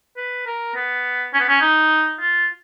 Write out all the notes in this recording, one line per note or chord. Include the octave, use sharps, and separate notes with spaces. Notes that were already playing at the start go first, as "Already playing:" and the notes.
B4
A#4
B3
C#4
B3
C#4
D#4
F4